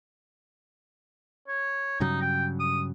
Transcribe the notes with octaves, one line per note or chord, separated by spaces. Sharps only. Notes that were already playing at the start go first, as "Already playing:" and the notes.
C#5
G2 C#3 F#3 D#4
G5
D#6